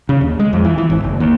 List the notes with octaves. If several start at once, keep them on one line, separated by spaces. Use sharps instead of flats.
C#3
D#2
G#3
F2
E3
E3
G#1
F#1
D#2